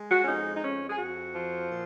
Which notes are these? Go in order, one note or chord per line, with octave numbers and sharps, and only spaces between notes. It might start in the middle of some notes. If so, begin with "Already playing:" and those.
Already playing: G#3
F#4
C#4
F2 D#4
D#4
F2 C#4
G#4
F2 F#4
F3
A#2